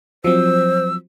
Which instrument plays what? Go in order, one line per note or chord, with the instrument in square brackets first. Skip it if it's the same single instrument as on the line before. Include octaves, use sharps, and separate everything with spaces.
[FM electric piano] F3 F#3 C4 [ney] C5 [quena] E6